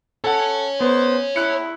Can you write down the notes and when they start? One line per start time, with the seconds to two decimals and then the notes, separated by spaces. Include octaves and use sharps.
0.24 A4 C#5 F#5 G#5
0.80 B3 C5
1.36 E4 F#6 C#7